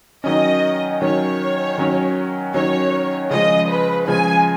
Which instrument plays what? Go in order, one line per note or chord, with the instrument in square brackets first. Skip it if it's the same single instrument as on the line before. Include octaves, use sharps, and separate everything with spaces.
[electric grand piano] D#3 F#3 C#4 [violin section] D#5
[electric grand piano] D#3 F#3 C#4 [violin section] C#5
[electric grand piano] D#3 F#3 C#4
[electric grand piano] D#3 F#3 C#4 [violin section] C#5
[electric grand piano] C#3 F3 G#3 [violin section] D#5
[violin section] B4
[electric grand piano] C#3 F3 G#3 [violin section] G#5